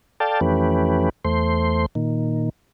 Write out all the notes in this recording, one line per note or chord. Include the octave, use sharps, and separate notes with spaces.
A4 D5 F5 G5 A5
F2 E3 A3 C#4 G4 B4
E2 A3 C5 C6
A#2 D#3